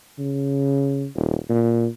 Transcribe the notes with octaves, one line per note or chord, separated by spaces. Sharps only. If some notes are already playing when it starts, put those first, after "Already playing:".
C#3
D#1
A#2